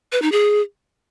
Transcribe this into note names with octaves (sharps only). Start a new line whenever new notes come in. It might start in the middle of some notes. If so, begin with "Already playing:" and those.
B4
D#4
G#4